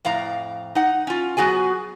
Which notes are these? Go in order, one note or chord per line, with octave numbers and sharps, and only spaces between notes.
F2 A2 F5 A#5
D#4 F#5
C#4 F4
F#3 B3 F#4 G#4 G#5